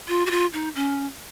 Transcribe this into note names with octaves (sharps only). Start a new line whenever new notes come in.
F4
F#4
F4
D#4
C#4